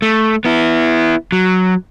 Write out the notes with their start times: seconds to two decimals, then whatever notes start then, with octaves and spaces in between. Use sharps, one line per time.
0.02 A3
0.45 B3 E4
1.32 F#3